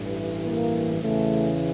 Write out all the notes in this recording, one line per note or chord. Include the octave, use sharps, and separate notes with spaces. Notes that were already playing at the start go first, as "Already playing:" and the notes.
Already playing: A1 G2 E3
A#3
E2 C#3 E3 A3